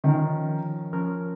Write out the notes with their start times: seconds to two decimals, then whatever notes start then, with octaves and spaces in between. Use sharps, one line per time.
0.04 D#3 F3 C#4 A#4
0.93 F3 C#4 A#4